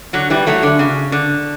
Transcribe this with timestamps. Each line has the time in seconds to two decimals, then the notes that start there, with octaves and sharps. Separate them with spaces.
0.13 D3 F#3
0.30 E3 G3
0.47 F#3 A3
0.63 D3
0.79 C#3
1.12 D3